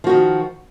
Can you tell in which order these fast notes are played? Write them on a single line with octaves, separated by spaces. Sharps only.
F3 F#4 D#3